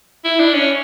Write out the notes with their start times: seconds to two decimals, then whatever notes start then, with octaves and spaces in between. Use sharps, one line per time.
0.25 E4
0.39 D4
0.54 C#4